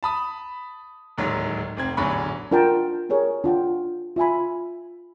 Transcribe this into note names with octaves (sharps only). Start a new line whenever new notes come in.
A5 B5 D#6
D1 D#2 G#2 F#3 C#5
F1 C4 G#6
A1 E2 D3 F#3 B5 C#6
D4 F4 A#4 F#5 G5 A5
G4 G#4 A#4 C#5
D4 F4 F#5 G5
F4 E5 G#5 B5